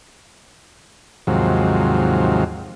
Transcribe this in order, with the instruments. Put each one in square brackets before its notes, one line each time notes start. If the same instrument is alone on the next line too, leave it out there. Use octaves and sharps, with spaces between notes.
[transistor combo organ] D#2 G#2 C3 F3 F#3